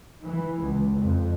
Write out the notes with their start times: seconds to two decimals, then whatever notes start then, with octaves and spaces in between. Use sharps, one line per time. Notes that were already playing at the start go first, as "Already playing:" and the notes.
0.24 E3
0.62 C#2
0.99 F2